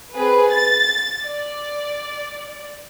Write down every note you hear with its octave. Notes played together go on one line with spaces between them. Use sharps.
C4 G#4 B4
A6
D5